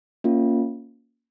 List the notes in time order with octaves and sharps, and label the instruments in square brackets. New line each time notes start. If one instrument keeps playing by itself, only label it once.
[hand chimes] A#3 C#4 F4